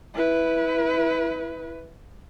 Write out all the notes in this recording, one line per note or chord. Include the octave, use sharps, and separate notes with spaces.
E4 B4